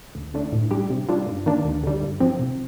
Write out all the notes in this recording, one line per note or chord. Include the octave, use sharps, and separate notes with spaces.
D2
D3 A3 D4
A2
G3 D4 G4
C3
G3 D4 F4
G2
D#3 A#3 D4
D2
D3 G3
G2
F3 C4
C3